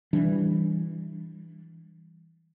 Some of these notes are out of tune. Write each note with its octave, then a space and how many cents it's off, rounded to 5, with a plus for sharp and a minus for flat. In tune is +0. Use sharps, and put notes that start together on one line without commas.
E3 -5 G3 +0 D4 +0